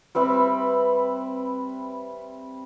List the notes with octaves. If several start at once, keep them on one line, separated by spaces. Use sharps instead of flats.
G3 C4 B4 E5